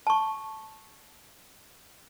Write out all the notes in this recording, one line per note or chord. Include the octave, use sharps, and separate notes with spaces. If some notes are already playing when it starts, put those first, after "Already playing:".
A5 C#6